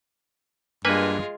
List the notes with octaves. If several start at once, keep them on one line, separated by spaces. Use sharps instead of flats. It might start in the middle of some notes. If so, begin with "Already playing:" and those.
G2 G#3 A#3 F4 B4 G#5